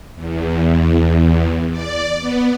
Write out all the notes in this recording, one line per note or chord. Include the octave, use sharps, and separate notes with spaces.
E2
D5
B3